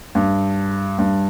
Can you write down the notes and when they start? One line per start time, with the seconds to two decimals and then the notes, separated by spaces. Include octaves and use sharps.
0.15 G2
0.98 G2